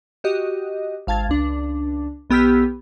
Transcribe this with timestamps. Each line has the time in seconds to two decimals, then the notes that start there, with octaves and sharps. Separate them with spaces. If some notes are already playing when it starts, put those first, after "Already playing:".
0.24 F#4 G4 D#5
1.07 G#1 F5 A5 G#6 A6
1.29 C#2 D4
2.30 B1 B3 G4 E6 F6 B6